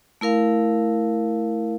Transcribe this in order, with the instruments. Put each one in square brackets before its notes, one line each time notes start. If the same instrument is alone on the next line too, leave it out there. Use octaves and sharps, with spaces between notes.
[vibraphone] A3 E4 A#4 F5